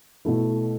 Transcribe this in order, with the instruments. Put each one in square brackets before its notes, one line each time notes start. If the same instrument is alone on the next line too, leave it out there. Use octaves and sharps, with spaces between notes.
[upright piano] B2 A3 E4